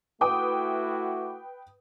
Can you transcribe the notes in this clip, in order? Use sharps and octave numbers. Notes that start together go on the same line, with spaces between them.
A3 E4 F#4 B4 G5 D6 D#6